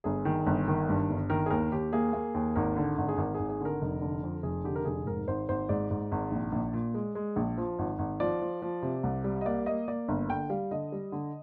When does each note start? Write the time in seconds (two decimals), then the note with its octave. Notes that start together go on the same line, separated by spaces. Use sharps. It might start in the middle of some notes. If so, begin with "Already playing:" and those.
0.04 G1 G#4
0.25 D#3
0.46 G1
0.68 D#3
0.89 G2
1.10 G1
1.30 D#3 A#4
1.46 G#4
1.50 D#2 A#4
1.72 D#2 G4
1.93 A#3 G#4
2.13 A#3
2.34 D#2
2.55 G#1 A#4
2.76 D3
2.98 G#1
3.08 G#4
3.18 G#1 A#4
3.34 G#1 G#4
3.49 G#4
3.60 D3 A#4
3.82 F1
4.01 D3
4.23 F2
4.43 F1 G#4
4.64 D3 G4
4.76 A#4
4.85 F1 G#4
5.06 G#2 A#4
5.28 G#1 C5
5.49 G#1 C5
5.69 G#2 D5
5.91 G#2
6.12 G#1
6.31 A#1
6.52 A#1
6.73 A#2
6.94 G#3
7.15 G#3
7.36 A#1
7.58 F3
7.79 G#1
7.99 G#1
8.20 F3 D5
8.42 F3
8.62 F3
8.82 C3
9.03 C2
9.24 G3
9.41 D#5
9.46 A#3 D5
9.66 A#3 D#5
9.88 A#3 D5
10.08 G1
10.29 D3 G5
10.50 G3 F5
10.71 D3 D#5
10.92 G3
11.12 D3